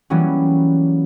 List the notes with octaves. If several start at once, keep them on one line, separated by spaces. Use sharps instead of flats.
E3 F#3 G3 A#3 B3 C#4